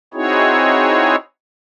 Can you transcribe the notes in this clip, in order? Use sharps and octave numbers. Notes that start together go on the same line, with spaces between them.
C4 D#4 E4 F#4 G#4 C#5